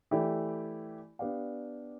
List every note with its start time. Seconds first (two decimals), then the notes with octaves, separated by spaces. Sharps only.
0.11 E3 A3 E4 G4 D5
1.19 B3 D4 G4 D5 F5